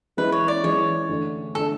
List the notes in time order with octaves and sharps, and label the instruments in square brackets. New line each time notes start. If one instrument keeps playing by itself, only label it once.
[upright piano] E3 G#3 C#4 E4 [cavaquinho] B4
[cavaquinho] C#5
D5
[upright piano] E3 G#3 C#4 E4 [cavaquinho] C#5
[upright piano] D3 A3 D4
[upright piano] D3 A3 D4 [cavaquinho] A4